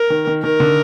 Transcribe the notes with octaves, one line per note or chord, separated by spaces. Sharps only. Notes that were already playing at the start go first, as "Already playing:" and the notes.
Already playing: A#4
D#3
D#3
D#3 A#4
D3